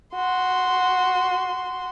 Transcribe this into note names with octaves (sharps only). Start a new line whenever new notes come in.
F#4 C6